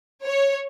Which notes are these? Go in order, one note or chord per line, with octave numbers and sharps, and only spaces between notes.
C#5